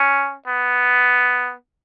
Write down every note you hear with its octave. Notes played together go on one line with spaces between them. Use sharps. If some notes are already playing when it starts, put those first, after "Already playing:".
Already playing: C#4
B3